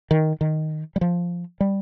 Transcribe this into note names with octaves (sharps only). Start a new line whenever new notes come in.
D#3
D#3
G3
F3
G3